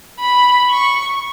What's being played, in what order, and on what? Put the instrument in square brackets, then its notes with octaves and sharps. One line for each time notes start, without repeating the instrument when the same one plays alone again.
[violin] B5
C#6